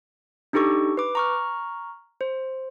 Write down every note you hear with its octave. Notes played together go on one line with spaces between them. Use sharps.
D4 D#4 G4 A4 C#6
B4 D6
A#5 C#6 F6
C5